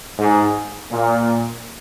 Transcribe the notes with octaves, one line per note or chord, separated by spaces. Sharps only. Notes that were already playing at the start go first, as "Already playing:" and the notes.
G#2
A#2